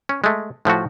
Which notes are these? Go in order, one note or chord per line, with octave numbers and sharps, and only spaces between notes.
C#4
G#3 A3
A2 F3 A3 F#4